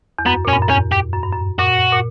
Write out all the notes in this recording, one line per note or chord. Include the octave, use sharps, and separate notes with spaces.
E2
F#2 B3
A#2 C#4
G2
F#2
E2 C#4
G4
F#2
G2
F#2
A#2 F#4
A#2